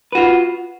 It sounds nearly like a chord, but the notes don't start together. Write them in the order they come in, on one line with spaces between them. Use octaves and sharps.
B4 F#4 F4